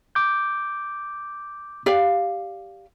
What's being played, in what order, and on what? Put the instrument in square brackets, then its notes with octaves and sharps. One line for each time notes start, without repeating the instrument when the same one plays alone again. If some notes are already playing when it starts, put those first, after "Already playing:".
[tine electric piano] D6 G6
[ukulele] G4 D5 F5